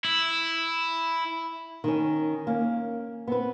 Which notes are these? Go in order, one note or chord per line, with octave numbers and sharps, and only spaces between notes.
E4
D#3 C#4
A#3 C#4
B3 C4 B4